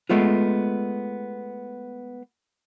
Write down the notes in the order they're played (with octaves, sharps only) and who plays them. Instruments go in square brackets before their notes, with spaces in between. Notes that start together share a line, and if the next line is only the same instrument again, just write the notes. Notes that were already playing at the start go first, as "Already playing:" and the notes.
[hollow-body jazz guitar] G#3 A3 B3 F4